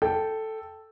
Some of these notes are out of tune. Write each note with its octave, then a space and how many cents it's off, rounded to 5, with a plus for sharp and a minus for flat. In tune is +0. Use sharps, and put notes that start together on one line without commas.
A4 +0 G5 +0